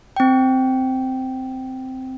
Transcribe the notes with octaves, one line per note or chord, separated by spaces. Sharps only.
C4 G5